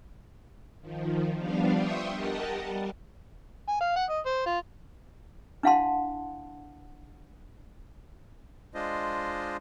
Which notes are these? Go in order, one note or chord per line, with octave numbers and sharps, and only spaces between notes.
D#3 F3
F3 G3 B3 D4 F5
E5 G5 C6 C#6 D#6
G4 A#4 D#5 F#5 A5
G3
G#5
F5
F#5
D#5
C5
F4
D4 E4 F5 F#5 A5 C6
G#3 D4 F4 C5 D#5